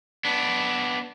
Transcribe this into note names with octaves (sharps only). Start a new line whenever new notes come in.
B3 D4